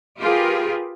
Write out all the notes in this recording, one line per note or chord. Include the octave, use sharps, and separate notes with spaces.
F4 G4 G#4 A#4 B4